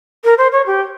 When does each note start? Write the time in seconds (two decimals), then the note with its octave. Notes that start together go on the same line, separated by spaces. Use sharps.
0.24 A#4
0.38 C5
0.52 C#5
0.66 G4